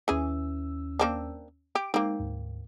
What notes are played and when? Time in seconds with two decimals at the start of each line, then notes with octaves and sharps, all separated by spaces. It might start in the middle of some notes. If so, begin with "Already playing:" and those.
0.08 D#2 E3 C#4 G#4 E6
0.99 A#3 C4 D4
1.75 G4 D7
1.94 G#3 A#3 C4 D#4
2.19 D2 G#2